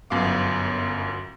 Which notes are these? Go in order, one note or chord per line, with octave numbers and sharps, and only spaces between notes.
G1 F#2 B3 F5 D6